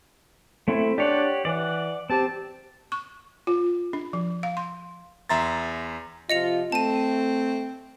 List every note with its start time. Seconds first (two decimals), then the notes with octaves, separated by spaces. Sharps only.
0.68 A3 C4 E4
0.98 D4 G4 C#5 D5 F#5
1.45 E3 D5 F#5
2.10 C4 G4 A5
2.92 C#6
3.47 F4
3.93 D4
4.13 F3
4.43 F5
4.57 C6
5.29 E2 E5 A#5 C6 A6
6.30 C3 F3 F4 D#5 C#7 F7
6.72 A3 C4 A5 D#7